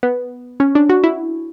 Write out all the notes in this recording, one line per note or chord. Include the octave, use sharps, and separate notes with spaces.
B3
C#4
D4
F#4
E4